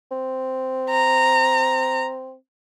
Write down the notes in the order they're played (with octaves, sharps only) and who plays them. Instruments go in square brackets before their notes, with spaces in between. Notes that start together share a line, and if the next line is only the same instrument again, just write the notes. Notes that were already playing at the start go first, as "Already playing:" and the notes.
[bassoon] C4
[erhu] A#5